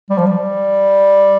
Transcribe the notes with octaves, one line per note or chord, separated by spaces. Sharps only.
G3
F3
G3